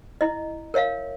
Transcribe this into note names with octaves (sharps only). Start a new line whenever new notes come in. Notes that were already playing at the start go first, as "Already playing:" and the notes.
E4 D#5
A#4 C#5 E5 F5